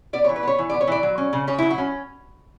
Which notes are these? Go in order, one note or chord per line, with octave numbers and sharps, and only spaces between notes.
B3 D5
E3 C#5
B4
B3 C#5
E3
B3 D5
C#5
E3 D5
F#3
C#4
C#3
C#3 C#5
F#3 E4
F#4
C#4